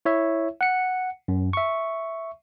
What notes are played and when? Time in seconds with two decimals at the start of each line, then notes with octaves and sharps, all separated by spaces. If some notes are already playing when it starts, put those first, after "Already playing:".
0.05 E4 C#5 E5
0.61 F#5 C#7
1.28 F#2
1.53 E5 C#6